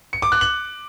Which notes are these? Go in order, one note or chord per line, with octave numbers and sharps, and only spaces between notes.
C#7
D6
F#6
F#7